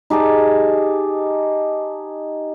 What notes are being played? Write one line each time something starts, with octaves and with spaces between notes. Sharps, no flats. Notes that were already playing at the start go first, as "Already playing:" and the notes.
D#4 G4 G#4 A5